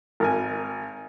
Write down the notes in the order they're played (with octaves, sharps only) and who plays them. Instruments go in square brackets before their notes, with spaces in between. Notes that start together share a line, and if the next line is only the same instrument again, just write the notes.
[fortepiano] G#1 A#4 G#5